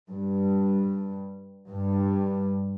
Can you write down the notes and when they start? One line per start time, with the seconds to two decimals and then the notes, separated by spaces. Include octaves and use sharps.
0.11 G2
1.70 G2